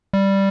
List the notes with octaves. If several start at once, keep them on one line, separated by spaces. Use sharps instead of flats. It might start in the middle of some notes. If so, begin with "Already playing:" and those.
G3